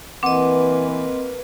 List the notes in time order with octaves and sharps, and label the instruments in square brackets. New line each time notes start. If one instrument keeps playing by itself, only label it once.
[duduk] E3 [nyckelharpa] A#3 B4 [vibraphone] C4 D#5 [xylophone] F#5 D6